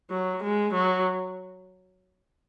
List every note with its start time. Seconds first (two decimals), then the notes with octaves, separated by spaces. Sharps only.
0.10 F#3
0.43 G#3
0.73 F#3